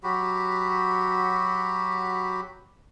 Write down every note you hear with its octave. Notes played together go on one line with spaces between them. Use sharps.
F#3 F#4 G4 B5